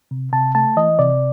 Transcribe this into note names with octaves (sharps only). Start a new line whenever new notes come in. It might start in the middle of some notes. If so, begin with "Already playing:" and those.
C3
C3 A5
A3 A5
E3 D#5
C3 D5